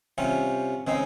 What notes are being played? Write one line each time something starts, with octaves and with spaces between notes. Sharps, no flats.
C3 G3 C#4 F4
C#3 G#3 C4 D#4